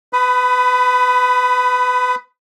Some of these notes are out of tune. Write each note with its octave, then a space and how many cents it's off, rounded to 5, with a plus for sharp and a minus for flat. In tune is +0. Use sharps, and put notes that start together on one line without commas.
B4 +25 B5 +0 D#6 +0